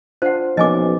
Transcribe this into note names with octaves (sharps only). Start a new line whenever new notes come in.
D4 F4 C5 F#5
B1 F3 A#3 C#4 D#5 G#5 D6